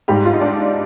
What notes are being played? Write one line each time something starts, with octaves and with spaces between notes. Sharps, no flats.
G#2 G3 G4
F4
D#4
D4